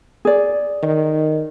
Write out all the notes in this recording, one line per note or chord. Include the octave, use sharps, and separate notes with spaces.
G#4 D5
D#3